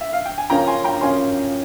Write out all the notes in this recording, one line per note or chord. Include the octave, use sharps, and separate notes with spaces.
E5
F5
G5
G#5
C#3 F3 A#3 C#4 G5 A#5
G#5 C6
G5 A#5
C#3 F3 A#3 C#4 G#5 C6